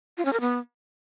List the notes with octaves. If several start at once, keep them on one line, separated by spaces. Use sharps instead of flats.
F4
C#4
A#4
B3